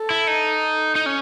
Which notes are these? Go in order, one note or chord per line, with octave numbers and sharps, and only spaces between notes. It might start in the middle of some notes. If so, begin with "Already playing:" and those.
Already playing: A4
E4
D#4
D#4
C#4